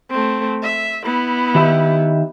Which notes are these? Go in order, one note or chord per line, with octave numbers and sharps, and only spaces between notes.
A3 C4
E5
B3 E4
D#3 G4 E5